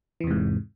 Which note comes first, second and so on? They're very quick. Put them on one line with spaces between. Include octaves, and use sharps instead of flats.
E3 E2 C3 G#2